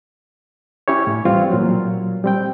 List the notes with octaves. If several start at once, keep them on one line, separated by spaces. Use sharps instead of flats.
C#4 E4 G4 C#5
A2
E3 G3 C4 F4
A#2 F#3
G3 C4 G5